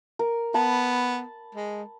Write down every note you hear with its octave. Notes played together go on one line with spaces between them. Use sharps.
A#4
B3 A5 B5
G#3